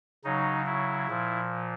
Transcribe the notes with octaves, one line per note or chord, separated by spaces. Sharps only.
C#3 F#3 D#4
E4
A#2 F3